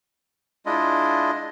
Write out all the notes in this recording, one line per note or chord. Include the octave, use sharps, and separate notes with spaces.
G#3 D4 E4 F4 D#5